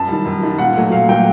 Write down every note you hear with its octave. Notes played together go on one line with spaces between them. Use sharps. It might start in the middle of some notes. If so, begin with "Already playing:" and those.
Already playing: F#2 A5
D#3 G3
F#2
D#3 G3
A#2 F#5
F#3 A3
A#2 F5
F#3 A3 G5